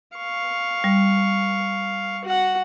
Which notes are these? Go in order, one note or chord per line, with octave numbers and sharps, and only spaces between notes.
F5 C#6
G3
F#4 F#5